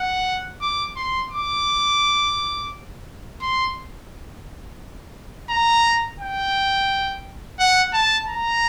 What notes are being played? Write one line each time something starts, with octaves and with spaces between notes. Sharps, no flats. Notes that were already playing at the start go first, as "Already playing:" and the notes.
Already playing: F#5
D6
C6
D6
C6
A#5
G5
F#5
A5
A#5